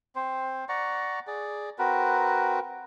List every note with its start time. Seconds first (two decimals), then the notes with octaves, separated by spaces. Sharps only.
0.15 C4 C5
0.69 D5 F#5 A#5 C#6
1.27 G#4 D5
1.79 C4 F#4 A#4 B4